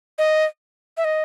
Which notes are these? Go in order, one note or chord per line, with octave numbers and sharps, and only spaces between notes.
D#5
E5
D#5